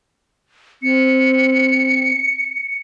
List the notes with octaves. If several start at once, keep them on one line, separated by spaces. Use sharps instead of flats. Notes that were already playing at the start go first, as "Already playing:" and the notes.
C4 C#7